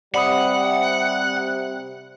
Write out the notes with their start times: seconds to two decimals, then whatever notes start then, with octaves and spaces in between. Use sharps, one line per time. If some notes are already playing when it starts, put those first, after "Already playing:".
0.14 C3 G3 D5 F#5 B5 D#6